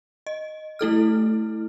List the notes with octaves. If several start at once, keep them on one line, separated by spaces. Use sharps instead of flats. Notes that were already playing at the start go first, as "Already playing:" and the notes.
D#5
A3 E4 A4 F6